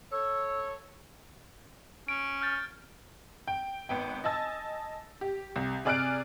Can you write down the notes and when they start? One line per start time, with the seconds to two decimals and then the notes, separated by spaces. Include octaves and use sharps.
0.12 A4 C#5 E6
2.08 C#4 D7
2.41 F6 G6 A6
3.47 G5
3.89 G#1 B3 G5
4.24 D#5 G#5 A5 E6 A6
5.21 G4
5.56 C2
5.85 C3 G#4 D5 F6 F#6 D7